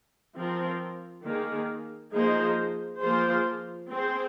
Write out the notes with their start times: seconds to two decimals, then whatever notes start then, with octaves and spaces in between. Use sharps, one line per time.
0.35 F3 C4 F4 A#4
1.24 D#3 A#3 G#4
2.12 F3 A#3 D#4 G#4 C5
3.00 F3 A#3 F4 G#4 C5
3.89 C4 G#4 C5